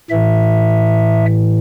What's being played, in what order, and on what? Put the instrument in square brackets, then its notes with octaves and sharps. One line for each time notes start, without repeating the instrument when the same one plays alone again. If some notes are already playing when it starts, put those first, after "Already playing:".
[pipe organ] A2 E3 E5